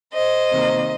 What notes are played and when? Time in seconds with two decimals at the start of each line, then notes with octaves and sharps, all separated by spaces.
0.14 C5 D#5
0.51 C3 D#3 A#3